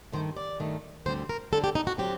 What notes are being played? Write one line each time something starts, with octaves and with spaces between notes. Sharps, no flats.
G2 D#3 A3 C5
D5
G2 D#3 A3
D2 D3 G3 C4 C5
A#4
D2 D3 G3 C4 A4
G4
D#4
F#4
D3 F#3 C4 G4